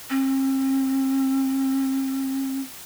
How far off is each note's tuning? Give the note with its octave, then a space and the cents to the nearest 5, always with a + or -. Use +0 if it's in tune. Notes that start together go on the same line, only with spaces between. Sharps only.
C4 +40